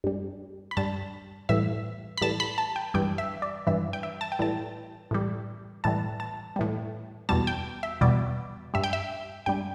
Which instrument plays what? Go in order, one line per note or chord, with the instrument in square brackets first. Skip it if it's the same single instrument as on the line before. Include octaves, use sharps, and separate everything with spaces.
[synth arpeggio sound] G2 G3
B5
G2 G3 A5
A2 E3 G3 E5
B5
A2 E3 G3 A5
B5
A5
G5
G2 E3 G3 G5
E5
D5
G2 E3 G3 E5
G5
E5
A5
G5
A2 E3 G3 A5
A2 E3 G3
A2 E3 G3 A5
A5
A2 E3 G3
E2 B2 G3 A5
G5
E5
E2 B2 G3 D5
G2 G3 E5
G5
E5
G2 G3 G5